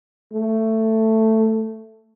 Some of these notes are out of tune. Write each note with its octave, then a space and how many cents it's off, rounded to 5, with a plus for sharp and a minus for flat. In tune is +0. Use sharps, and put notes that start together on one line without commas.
A3 +10